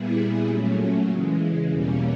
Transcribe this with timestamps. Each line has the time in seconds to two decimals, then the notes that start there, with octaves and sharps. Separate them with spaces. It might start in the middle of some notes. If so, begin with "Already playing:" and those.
Already playing: A#2 G3 B3 E4 G#4
0.48 A#2 F#3 A3 C#4
1.09 C#3 E3 G#3
1.69 E2 B2 G3 A#3 C#4